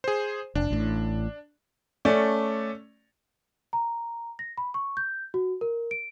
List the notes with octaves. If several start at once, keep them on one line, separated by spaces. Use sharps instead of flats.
G#4 C5
F1 D4
A1 A2
A3 C#4 D5
A#5
A#6
B5
C#6
G6
F#4
A#4
D7